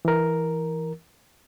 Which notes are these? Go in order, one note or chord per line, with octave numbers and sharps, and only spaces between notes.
E3 A#4